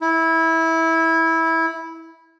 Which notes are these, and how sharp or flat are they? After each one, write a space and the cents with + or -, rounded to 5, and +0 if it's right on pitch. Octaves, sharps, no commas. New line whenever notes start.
E4 -15